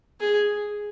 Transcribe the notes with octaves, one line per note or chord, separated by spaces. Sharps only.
G#4